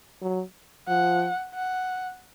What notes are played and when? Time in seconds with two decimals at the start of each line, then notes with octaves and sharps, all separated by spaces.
0.22 F#3
0.88 F3 F#5
1.54 F#5